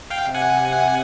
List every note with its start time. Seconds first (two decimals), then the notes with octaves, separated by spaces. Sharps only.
0.10 F5 G5
0.22 C3
0.34 F#5 G#5